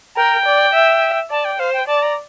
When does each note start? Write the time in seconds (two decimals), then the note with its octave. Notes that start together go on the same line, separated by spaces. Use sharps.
0.16 A#4 G5
0.45 D5
0.73 E5
1.30 D5 A5
1.45 G5
1.59 C5 F5
1.73 G5
1.87 D5 A5
2.02 A#5